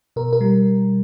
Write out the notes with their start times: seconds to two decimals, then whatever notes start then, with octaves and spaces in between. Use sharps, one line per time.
0.16 B2 A#4
0.33 A#4
0.41 G3